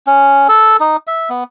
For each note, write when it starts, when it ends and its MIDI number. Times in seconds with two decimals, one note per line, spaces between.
0.07 0.47 61
0.48 0.77 69
0.80 0.96 63
1.07 1.30 76
1.30 1.44 59